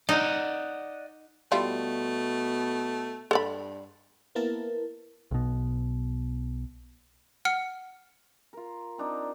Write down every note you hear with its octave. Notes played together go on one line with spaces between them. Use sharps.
D#4 D5 D#5 F#5
B2 G3 A3 E4 F4
G2 A4 D5 B5
A#3 B3 E4 A#4 A5
B1 B2
F#5 F6 C#7
F4 A#4
C4 D4 D#4